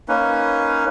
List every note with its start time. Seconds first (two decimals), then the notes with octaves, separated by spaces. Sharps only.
0.08 A#3 C#4 D#4 B4